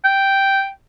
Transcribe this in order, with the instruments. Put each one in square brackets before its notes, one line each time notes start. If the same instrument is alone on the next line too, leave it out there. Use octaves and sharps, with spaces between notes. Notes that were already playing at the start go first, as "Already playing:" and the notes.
[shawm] G5